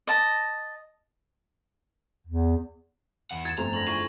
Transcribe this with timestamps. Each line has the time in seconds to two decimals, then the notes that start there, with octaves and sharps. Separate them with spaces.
0.07 D#5 A5
2.27 E2
3.31 E2 F#5
3.45 G#6 A6 E7
3.58 G1 F2 A2 G#4 C5 A#5
3.73 F#2 D3 D#5 A#6 F#7
3.88 E3 F4 C#6